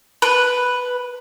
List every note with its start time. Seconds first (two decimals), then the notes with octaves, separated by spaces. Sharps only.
0.22 B4